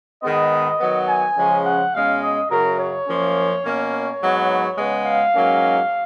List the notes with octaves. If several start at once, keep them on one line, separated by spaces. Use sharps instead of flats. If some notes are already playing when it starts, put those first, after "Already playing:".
G#2 D#3 G#3 B3 D#5
D#3 F#3 B3
G#5
C#3 F3 G#3 C#4
F#5
B2 G#3 C#4 F5
D#5
F#2 C#3 F#3 A#4
C#5
F#2 F3 A#3 C#4
B2 A#3 C#4
C#5
G#2 F#3 B3
C#3 G#3 B3
F5
G#2 F#3 A#3 C#4